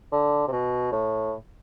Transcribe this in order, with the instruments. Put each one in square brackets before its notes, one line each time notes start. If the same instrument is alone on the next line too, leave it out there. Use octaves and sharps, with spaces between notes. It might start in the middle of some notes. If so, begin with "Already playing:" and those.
[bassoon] D3
C3
B2
A2